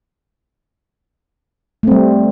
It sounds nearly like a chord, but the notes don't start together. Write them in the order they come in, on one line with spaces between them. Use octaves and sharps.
A3 C4 G3